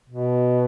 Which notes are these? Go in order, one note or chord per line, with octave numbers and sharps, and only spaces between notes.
B2